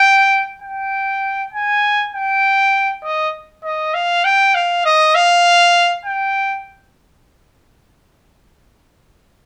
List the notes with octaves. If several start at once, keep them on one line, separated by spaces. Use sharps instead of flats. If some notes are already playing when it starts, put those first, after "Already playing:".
Already playing: G5
G5
G#5
G5
D#5
D#5
F5
G5
F5
D#5
F5
G5